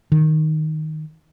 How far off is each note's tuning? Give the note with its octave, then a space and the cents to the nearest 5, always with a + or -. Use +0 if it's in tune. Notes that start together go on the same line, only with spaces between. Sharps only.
D#3 +0